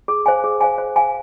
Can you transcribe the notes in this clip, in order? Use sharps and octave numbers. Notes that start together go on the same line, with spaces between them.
G#4
C5 F5 G#5
G#4
C5 F5 G#5
C5
F5 G#5